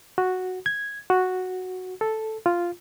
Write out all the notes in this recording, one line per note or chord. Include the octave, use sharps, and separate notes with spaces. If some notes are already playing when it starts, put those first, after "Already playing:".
F#4
G#6
F#4
A4
F4